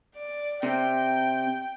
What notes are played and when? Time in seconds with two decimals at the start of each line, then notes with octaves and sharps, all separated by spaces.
0.15 D5
0.63 C3 G5